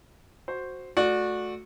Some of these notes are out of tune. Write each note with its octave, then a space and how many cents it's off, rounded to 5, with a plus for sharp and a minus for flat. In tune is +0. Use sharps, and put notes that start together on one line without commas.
F#4 +0 C5 +0
A3 -10 F#4 -20 D5 +0